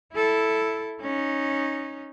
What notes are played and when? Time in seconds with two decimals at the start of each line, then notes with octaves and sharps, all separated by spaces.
0.14 E4 A4
1.01 C#4 D#4